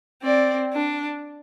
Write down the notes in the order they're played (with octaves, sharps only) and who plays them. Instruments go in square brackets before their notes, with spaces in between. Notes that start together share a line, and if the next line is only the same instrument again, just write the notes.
[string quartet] C4 [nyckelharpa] D5
[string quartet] D4